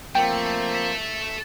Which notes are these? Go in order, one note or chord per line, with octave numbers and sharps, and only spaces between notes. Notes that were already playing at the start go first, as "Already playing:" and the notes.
F3 A3 A#3 C4 G5
A4 E5